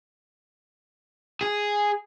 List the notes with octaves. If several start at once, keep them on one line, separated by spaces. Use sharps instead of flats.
G#4